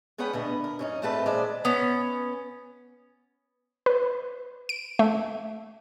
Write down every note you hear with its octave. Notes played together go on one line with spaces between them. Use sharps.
G#3 B3 C#4 B4 F#5 G5
D2 B2 B3
A#4
F#2 C#4 D#4
E2 G#2 A3 C4 B4 A5
E2 A#2 G#3 C5 D5
B3 C#4
B4
D7
A3